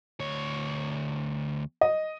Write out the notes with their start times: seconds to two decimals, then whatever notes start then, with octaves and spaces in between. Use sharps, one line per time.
0.20 D2 C#5
1.81 D#5